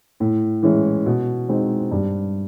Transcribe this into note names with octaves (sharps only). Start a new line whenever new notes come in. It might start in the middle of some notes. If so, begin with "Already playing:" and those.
A2
E3 G#3 C#4 E4
B2
G#3 C4 D#4
G2